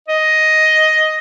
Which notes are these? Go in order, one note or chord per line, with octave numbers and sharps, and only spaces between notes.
D#5